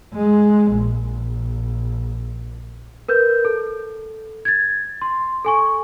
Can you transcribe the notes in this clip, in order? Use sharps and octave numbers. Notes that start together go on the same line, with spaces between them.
G#3
A#1
A#4 B4 G6
A4
G#6 A6
C6
A4 G#5 C#6